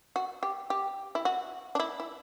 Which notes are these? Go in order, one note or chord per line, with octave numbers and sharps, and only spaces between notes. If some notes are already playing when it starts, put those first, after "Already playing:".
F#4
G4
G4
E4
F#4
D4
E4
E4